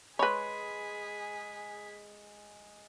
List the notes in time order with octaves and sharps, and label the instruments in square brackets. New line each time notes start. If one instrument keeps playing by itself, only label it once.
[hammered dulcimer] G#3 [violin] G#4 B6 [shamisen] B4 C#5 [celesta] B5